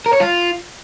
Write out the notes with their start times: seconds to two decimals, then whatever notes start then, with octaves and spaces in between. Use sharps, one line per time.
0.06 A#4
0.13 C#5
0.20 F4